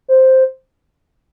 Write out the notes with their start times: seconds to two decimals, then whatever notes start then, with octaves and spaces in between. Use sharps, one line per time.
0.08 C5